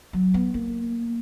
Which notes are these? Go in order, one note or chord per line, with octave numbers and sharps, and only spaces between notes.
F#3
B3
A#3